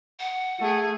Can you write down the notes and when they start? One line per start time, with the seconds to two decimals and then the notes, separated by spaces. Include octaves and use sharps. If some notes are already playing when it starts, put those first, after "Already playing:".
0.20 F#5
0.59 A3 G#4